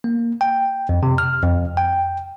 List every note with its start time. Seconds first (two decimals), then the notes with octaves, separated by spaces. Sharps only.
0.04 A#3
0.41 G5
0.89 F2
1.03 C3
1.18 F6
1.43 F2
1.77 G5